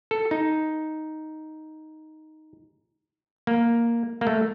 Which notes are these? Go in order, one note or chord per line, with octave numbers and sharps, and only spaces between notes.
A4
D#4
A#3
A#3
A3